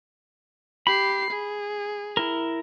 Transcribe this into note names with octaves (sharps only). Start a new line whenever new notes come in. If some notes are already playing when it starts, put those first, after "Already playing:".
G4 B5 C7
G#4
E4 A#4